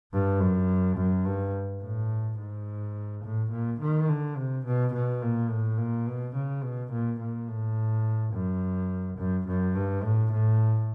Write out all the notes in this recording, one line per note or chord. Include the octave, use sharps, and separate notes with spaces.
G2
F#2
F#2
G2
A2
G#2
A2
A#2
D#3
D3
C3
B2
B2
A#2
A2
A#2
B2
C#3
B2
A#2
A#2
A2
F#2
F#2
F#2
G2
A2
A2